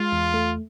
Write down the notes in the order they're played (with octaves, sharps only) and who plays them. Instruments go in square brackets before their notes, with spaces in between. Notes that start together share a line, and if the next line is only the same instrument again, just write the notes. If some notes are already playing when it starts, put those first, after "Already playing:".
Already playing: [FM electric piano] G#3 [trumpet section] F4
[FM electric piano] E2
A3